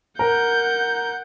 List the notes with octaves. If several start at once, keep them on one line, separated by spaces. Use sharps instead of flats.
A#4 F#5 G6